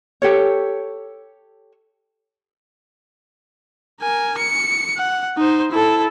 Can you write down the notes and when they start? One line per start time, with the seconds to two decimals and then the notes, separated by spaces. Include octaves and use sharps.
0.22 G4 A4 C#5
4.02 A#4 G#5
4.38 C#7
4.97 F#5
5.38 D#4 C5
5.72 E4 A4